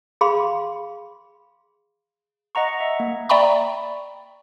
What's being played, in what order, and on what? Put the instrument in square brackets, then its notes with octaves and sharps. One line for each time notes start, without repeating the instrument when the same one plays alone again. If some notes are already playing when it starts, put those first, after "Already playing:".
[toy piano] G#4 F5 B5 C6
[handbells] D#5 F#5 A#5 C#6
E5
A#3
[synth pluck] D5 E5 G5 A#5 B5 C#6